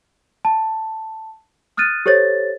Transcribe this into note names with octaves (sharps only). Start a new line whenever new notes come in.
A5
D#6 F6 F#6 A6 D#7
G4 A4 C5 C#5 A6